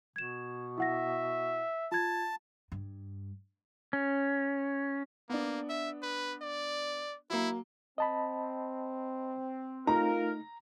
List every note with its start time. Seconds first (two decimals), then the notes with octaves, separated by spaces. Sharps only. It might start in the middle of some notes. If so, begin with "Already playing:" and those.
0.16 B2 G#6 E7
0.78 E4 E5 F#5 A#6
1.92 F4 A5 G#6
2.72 G2
3.93 C#4
5.29 A#3 B3 D4
5.69 E5
6.03 B4
6.42 D5
7.30 F#3 A#3 E4
7.98 C4 D#5 A5 B5
9.87 A3 D#4 F4 A#4 A#5